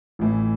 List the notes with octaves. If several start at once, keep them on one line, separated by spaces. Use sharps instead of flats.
A1 A2 E3